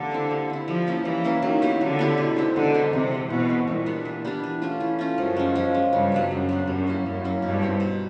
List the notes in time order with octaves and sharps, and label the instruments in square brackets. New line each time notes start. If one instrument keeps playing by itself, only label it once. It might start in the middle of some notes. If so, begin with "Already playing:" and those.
Already playing: [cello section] D3 [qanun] G3 A#3
[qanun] C4 E4
G3
C4 E4
[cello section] F3 [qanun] G3
[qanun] A#3 C#4 E4
[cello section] E3 [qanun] G3
[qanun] A#3 C#4 E4
[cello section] D#3 [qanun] F#3
[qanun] B3 E4 G4
[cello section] D3 [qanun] F#3
[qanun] B3 E4 G4
B2
G#3 C4 D#4
[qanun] B2 [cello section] D3
[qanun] G#3 C4 D#4
[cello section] C3 [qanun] E3
[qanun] G#3 C4
[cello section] B2 [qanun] E3
[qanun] G#3 C4
[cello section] A#2 [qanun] E3
[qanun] G3 B3 D4
E3
G3 B3 D4
E3
A3 C#4 F4
E3
A3 C#4 F4
[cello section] F#2 [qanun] F3
[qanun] G#3 C#4
F3
G#3 C#4
[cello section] G2 [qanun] C#3
[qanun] F#3 B3 D4
[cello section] F#2 [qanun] C#3
[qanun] F#3 B3 D4
[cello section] F#2 [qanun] G3
[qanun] A#3 C#4 E4
[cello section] F#2 [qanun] G3
[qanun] A#3 C#4 E4
[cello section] G2 [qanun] B2
[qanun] G3 C4 D#4
B2